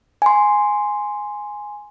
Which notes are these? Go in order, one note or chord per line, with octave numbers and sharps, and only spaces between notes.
G#5 C6